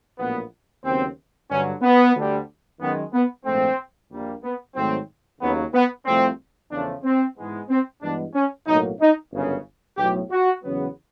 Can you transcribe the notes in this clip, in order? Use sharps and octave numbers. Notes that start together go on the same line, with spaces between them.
A#1 A2 F#3 A#3 B3
D#2 C#3 F#3 B3 C4
G2 D3 F#3 C#4
B3
D2 D3 G3
F#2 D#3 G#3 B3
B3
A#1 G#2 F3 A3 C4
A#1 A#2 G3 A#3
B3
G#2 D#3 F#3 A3 C4
D#2 C#3 F#3 B3
B3
C2 C3 F3 A3 C4
E2 C#3 F3 A3 D4
C4
G#2 E3 G#3 B3
C4
G2 E3 G#3 B3 D4
C#4
B1 A2 F#3 A#3 D#4
D#4
G1 F#2 C#3
B1 A2 F#3 G4
F#4
E2 C#3 F#3 B3